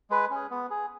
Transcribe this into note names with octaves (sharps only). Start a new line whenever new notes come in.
G#3 B4
C#4 G#4
B3
G#4